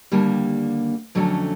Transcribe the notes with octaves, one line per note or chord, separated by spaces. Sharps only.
D#2 D3 G3 A#3
F2 D3 F#3 A3 C#4